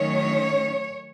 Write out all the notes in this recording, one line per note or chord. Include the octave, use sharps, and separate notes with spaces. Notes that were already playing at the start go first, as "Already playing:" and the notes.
Already playing: D#3 F#3 A3 C#4 C#5